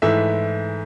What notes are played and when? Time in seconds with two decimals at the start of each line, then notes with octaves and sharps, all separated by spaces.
0.02 G#2 E3 A3 E5